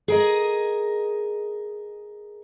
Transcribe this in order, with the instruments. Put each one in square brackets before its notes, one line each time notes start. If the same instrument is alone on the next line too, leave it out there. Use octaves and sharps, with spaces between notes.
[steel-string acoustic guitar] G#4 A#4 D#5